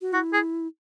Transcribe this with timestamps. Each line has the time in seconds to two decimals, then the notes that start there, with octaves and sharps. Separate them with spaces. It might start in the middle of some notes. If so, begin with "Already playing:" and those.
0.01 F#4
0.13 E4 F#4
0.33 G#4